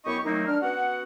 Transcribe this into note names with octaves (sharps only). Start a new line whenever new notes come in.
F#2 B3 E4 G4 D#5 C#6
D#3 F#3 A3 A#3 C4 D#4
D4 F6
B3 C#4 F#4 F#5